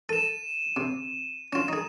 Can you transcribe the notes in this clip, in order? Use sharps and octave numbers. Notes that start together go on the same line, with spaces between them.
A4 D#7 E7
C3
C#4 F4 E7
D#4 G#4